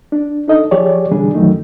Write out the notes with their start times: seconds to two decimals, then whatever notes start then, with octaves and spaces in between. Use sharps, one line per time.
0.12 D4
0.48 D4 D#4 A4 D#5
0.71 F3 G4 G#4 C#5 D5
1.11 B2 D3 E3 G3 D4 G#4
1.34 F#2 D#3 E3 F#3 A3 D#4